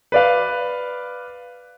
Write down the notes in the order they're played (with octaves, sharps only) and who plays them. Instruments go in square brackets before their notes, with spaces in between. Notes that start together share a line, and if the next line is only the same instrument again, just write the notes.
[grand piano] B4 D5 F5